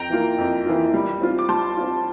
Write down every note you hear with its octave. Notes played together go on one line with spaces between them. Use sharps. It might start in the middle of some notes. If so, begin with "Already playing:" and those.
Already playing: F2 G5 A#5
E3 A#3 F4
F2
E3 A#3 F4
G3
C4 F4
D6
G3 A5 C6
C4 F4